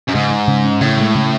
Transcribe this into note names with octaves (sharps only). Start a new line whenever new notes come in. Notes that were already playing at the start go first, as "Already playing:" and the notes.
F#2
G#2 C#3
G#3
C#3
C#4
A2 C#3
G#3
C#3